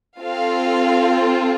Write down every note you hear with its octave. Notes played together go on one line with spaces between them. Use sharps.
C4 F4 A4 F5